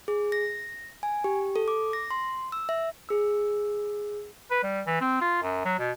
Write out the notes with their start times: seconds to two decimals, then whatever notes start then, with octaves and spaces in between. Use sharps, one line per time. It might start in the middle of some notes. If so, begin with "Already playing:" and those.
0.08 G#4
0.32 A#6
1.03 G#5
1.24 G4
1.56 A4
1.68 D6
1.93 A#6
2.11 C6
2.52 E6
2.69 E5
3.09 G#4 E6
4.51 B4
4.63 G3
4.86 E3
5.01 C4
5.21 F4
5.42 F#2
5.65 F#3
5.78 B2